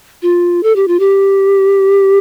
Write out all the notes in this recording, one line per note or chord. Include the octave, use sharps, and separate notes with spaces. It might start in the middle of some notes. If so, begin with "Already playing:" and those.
F4
A4
G4
F4
G4